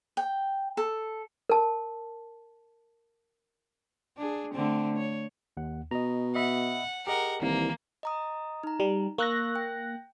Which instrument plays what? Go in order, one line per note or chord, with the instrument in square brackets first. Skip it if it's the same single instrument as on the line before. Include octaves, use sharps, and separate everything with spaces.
[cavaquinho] G5
A4
[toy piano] A#4 A5
[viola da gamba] D4 G#4
D3 A3 C4
C#5
[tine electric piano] D#2 F#5
[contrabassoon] B2 [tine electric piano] D#5 A#5
[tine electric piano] D#5 E5 B5 [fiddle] F#5
[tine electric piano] G4 G#4 D#5 [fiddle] A#4 F#5
[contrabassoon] C2 [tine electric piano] D#3 E3 [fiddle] A#3
[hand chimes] D#5 A#5 D#6
D#4 A#5
[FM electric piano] G3
[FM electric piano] A#3 F#6 A#6 [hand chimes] C#6 E6
[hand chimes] G5